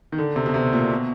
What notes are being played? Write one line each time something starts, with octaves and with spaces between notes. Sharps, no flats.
D#3
D3
C3
B2
C3
A#2
B2